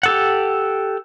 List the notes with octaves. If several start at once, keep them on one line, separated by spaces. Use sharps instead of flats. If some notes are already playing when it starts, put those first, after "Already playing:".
G4 A4 F#5